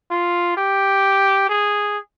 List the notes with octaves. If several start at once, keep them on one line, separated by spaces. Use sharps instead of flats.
F4
G4
G#4